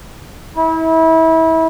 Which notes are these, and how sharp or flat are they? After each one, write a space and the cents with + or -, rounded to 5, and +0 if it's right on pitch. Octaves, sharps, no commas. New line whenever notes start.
E4 -30